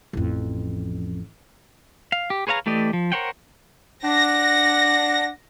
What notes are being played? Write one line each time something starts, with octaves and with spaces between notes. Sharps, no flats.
A1 F2
F5
G4
G#4 B4 C#5 F5 A#5
E3 A3 G4 D5 D#5
F3
A#4 C5 C#5 F#5 G5
D4 F#5 A#6